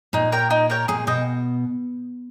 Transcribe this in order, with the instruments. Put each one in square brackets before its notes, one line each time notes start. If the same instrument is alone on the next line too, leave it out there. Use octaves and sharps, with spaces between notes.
[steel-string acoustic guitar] A#2 [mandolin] D#4
[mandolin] A#4 C#5 G5
D#4
A#4 C#5 G5
[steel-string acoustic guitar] A#2 [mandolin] G#4
[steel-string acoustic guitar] B2 [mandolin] D#5 G5